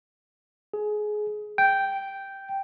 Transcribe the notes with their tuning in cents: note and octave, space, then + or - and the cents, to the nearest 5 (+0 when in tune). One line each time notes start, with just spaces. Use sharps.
G#4 +20
G5 -5